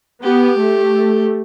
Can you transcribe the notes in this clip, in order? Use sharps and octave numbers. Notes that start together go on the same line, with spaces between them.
B3 G4
A3